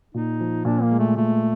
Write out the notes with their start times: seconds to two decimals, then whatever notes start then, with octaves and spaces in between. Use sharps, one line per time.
0.14 A#2 D#4
0.40 F3
0.65 A#2 D4
0.82 A#3
0.92 G#3
0.99 A3
1.17 A#2 A3